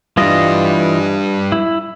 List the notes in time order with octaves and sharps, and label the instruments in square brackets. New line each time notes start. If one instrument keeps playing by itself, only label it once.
[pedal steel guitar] E3 F4 D#5 [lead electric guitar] G3 D4
[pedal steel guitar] E4